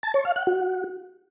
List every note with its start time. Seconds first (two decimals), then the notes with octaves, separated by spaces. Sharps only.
0.03 A5
0.14 C#5
0.25 F5
0.36 F#5
0.47 F#4